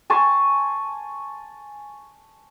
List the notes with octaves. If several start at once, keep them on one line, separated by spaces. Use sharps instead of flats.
G#5 A5 C6 C#6